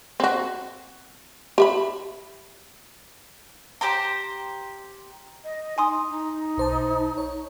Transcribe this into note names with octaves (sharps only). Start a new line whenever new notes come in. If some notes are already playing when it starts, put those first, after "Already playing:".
C4 F#4
G4 E5 B5
G4 C5 A#5
D#5
D#4 G#5 C6 D#6
D#4
B1 C5 A5
C#5